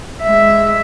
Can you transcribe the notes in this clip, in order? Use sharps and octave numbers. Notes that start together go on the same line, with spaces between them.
G#3 E5